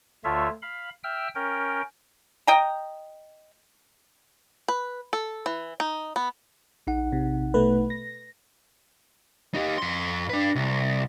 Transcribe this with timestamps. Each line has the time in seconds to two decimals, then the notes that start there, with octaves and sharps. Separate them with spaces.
0.24 D2 D3 A3 F4 C#5 E5
0.62 F5 B5
1.04 E5 G5 E6 F6
1.35 C#4 A#4 G5
2.47 D#5 G5 A#5
4.68 B4
5.13 A4
5.46 E3
5.80 D#4
6.16 B3
6.87 A#1 D#4 F#5
7.12 C3
7.54 B2 A3 B4
7.90 A#6
9.54 D#4 G4
9.78 F2 C6
10.29 D4 B4
10.55 C2